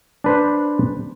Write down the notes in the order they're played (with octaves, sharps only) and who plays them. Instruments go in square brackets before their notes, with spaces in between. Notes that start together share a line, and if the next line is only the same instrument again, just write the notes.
[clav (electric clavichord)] D4 B4 C5